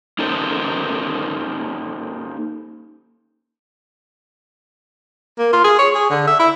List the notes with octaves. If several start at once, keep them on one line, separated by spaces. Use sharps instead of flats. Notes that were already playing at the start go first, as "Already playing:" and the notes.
A#3 C#4 D#4 A4 A#4 C5
A#3
F4
G#4
C#5
G#4
D3
E5
E4